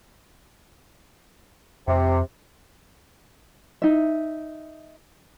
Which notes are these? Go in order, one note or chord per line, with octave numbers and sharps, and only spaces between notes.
F2 C3
D#4 E5